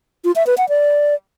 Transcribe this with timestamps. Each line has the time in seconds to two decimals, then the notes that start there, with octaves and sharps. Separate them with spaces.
0.25 F4
0.36 E5
0.47 B4
0.58 F#5
0.69 D5